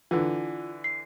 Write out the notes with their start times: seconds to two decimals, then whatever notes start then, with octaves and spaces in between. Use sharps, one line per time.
0.11 D3 E3 F4
0.84 C7